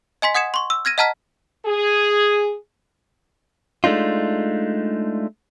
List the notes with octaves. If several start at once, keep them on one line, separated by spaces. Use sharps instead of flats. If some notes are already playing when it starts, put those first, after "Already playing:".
D#5 G#5 C6 B6
F#5 D#6 G#6 C#7 E7
C6 C#6
E6
F6 G#6 A#6 D#7
D#5 F#5 A5 A#5 F6 B6
G#4
G#3 A3 D4 D#4 F4